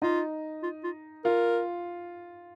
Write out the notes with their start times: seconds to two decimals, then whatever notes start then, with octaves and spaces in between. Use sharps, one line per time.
0.02 D#4 F4
0.63 F4
0.84 F4
1.25 F4 A#4